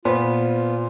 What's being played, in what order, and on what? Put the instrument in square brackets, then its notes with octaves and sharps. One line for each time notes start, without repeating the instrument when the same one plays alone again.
[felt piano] A#2 [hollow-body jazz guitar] B3 B4 [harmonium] F4 [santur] C5